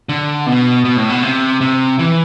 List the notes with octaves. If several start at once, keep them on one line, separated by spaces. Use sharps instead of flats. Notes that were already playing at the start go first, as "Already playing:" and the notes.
D3
B2
B2
A2
B2
C3
C3
E3